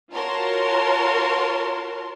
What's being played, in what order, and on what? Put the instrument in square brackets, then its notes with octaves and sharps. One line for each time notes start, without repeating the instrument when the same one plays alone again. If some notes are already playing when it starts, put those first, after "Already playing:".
[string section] F4 F#4 A#4 C#5 A5 C6